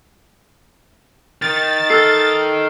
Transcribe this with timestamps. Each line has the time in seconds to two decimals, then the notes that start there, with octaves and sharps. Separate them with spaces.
1.42 D#3 A6
1.90 A4 F6 C7